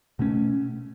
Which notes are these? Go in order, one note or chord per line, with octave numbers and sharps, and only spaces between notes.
B2 A3 C#4